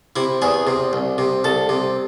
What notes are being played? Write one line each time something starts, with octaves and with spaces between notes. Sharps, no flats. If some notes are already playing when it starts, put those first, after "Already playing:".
C3 E4
E2 G#4
C3
C2
C3
C2 A4
C3